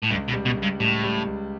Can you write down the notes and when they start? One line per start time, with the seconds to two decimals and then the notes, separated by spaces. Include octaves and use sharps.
0.03 A2
0.10 C#2 G2
0.28 B2
0.34 G3
0.45 B2
0.57 C#2
0.63 G2
0.80 A2 G3
1.03 G3
1.26 C#2